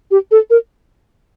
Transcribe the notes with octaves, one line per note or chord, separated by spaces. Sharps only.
G4
A4
A#4